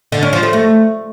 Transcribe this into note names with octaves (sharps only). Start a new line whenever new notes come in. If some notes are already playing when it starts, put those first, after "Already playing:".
D3
C#4
F3
A3
A3